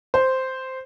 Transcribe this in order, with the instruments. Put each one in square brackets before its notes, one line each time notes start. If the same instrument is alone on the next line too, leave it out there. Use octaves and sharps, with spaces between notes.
[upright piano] C5